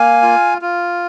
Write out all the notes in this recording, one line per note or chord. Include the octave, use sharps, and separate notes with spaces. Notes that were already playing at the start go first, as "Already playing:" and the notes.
Already playing: A#3 F5 G#5
F4
F4